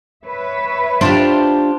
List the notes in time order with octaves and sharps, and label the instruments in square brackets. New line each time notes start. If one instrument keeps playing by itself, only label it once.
[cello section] B4 C#5 E5
[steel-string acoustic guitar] D4 F4 G4 [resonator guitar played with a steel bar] C5